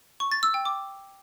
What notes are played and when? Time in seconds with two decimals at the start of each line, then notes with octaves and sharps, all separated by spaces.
0.20 C#6
0.31 A6
0.43 E6
0.54 G5
0.65 D6